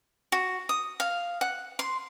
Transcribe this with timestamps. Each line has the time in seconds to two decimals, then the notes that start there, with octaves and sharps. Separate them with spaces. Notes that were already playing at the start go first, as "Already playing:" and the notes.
0.32 F#4
0.69 D#6
1.00 F5
1.41 F#5
1.79 C6